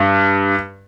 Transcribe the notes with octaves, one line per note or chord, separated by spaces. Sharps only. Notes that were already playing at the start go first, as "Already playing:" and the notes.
Already playing: G2